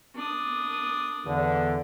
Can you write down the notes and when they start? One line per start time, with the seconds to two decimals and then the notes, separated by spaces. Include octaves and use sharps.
0.16 D4 D#6
1.26 E2 D3